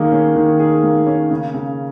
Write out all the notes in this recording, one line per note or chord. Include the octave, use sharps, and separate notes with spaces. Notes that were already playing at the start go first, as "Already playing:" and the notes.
Already playing: D#3 A#3 G#4
C#4
D#3
G#4
A#3
C#4
C#3
C#3